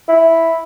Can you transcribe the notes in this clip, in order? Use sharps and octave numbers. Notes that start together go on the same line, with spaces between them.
E4